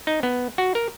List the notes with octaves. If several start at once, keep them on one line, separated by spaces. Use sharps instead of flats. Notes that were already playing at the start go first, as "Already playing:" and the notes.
D#4
B3
F#4
A#4